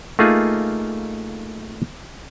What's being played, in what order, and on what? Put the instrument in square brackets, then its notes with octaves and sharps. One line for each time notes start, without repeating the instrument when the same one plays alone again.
[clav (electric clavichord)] A3 A#3 D#4 F4 G#4